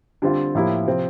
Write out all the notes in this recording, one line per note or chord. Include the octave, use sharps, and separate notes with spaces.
D3 G3 C4 F4
A2 F3 A#3 E4 G4
C3 F3 C4